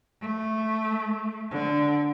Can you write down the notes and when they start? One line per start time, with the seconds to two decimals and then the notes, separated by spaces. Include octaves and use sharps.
0.21 A3
1.51 D3